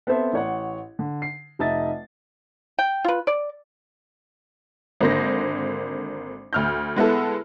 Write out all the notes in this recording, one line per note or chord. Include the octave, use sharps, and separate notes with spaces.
B3 C4 A4 C5 E5
A1 C#5 F#5
D3
C7
F1 D#4 D#5 E5 A5 A6
G5
F4 B4
D5
G#1 D3 A#3 C5 A#6
D2 F6 G6
G#3 B3 E4 A4